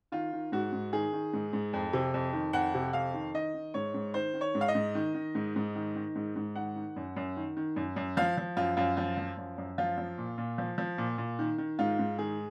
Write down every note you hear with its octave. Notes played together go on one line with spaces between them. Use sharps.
D#3 F4
D#3
G#2 F#4
G#2
D#3 G#4
D#3
G#2
G#2
F2
C3
F2
D#3
F2 F#5
C3
F2 F5
D#3
D#3 D#5
D#3
G#2 C#5
G#2
D#3 C5
D#3
C#5
G#2
F5
D#5
G#2
D#3
D#3
G#2
G#2
D#3
D#3
G#2
G#2
D#3 F#5
D#3
F#2
F#2
D#3
D#3
F#2
F#2
F3 F5
F3
F#2 F4
F#2 F4
F3 F4
F3
F#2
F#2
F3 F4
F3
A#2
A#2
F3
F3
A#2
A#2
D#3
D#3
G#2 F4
G#2
D#3 G#4